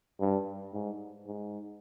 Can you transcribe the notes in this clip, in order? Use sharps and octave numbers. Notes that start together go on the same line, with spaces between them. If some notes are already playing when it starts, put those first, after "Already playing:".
G2
G#2
G#2